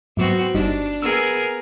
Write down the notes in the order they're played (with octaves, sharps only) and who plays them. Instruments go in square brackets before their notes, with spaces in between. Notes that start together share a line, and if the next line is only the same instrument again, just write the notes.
[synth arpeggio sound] G#2 F#3 [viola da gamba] B3 C4 F#4
[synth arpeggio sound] G1 G3 D#4 [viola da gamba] D4
[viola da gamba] B3 G#4 A#4 [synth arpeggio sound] E6